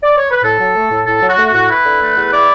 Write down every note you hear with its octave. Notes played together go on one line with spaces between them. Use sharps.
D5
C#5
B4
A2 A4
F#3
A3
A2
A2 A4
F#3
F#4
A3
A2 F#4
E4 B4
D3
A3
E2
E4 D5